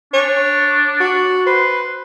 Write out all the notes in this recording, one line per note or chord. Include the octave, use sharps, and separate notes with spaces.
D4 C#5
F#4
B4 C5